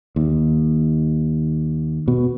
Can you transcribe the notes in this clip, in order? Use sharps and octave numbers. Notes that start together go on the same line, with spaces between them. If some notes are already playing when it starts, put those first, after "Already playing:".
D#2
B2